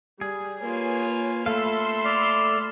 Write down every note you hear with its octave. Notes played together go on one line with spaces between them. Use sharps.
G3 G#4
A#3 F4 B4 C#5 G#5
A3 A4 F5 B5 C6 E6
D5 F6